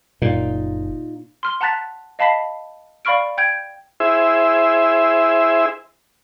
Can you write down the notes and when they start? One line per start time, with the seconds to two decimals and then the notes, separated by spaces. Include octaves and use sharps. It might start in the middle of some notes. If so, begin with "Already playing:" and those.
0.22 F#1 A#2 D#4 F4
1.43 C6 F6 G7
1.61 F#5 A5 A#5 F#6 A6 B6
2.19 D#5 F5 A5 B5 B6 C7
3.05 D5 F5 B5 C#6 F6 D7
3.38 G5 G6 G#6 D7
4.00 E4 G#4 C5 E5